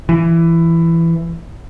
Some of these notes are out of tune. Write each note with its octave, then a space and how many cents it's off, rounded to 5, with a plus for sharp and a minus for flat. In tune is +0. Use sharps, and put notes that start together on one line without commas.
E3 +15